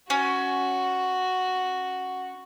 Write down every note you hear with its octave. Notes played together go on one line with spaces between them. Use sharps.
C#4 F#4